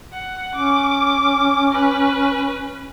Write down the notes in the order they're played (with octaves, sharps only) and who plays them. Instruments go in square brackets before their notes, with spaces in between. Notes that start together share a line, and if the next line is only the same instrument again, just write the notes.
[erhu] F#5
[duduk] C#4 [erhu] D6
[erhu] B4